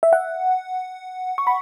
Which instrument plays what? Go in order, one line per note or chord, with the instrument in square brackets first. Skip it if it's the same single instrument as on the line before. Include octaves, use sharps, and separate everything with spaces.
[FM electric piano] E5
F#5
C#6
B5